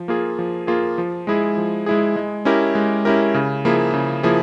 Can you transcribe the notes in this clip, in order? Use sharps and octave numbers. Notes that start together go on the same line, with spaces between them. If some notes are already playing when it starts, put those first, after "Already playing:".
Already playing: F3
A#3 F4 G#4
F3
A#3 F4 G#4
F3
G#3 E4 G#4
F3
G#3 E4 G#4
G#3
C#4 E4 G4 A#4
G#3
C#4 E4 G4 A#4
C#3
F3 A#3 E4 G#4
C#3
F3 A#3 E4 G#4